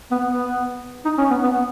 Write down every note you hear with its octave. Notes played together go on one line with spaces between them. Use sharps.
B3
B3
D#4
C#4
B3
B3